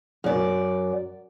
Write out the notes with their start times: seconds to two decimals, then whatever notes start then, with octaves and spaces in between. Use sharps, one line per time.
0.24 F#2 D5